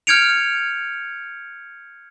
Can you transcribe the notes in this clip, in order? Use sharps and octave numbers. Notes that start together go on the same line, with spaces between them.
F6 G6 G#6 C#7 D7 F7